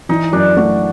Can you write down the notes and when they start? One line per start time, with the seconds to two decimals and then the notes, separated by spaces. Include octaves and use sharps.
0.09 E3 D#4
0.33 F#2 D4
0.57 A3 F#4